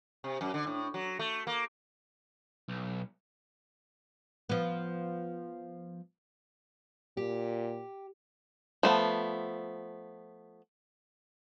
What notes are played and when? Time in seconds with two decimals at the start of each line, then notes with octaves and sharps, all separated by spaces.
0.24 C3
0.41 F#2
0.54 D3
0.67 A2
0.94 F#3
1.19 A3
1.47 A#3
2.68 B1
4.49 F3 B3
7.17 A#2 G4
8.83 F3 A3 B3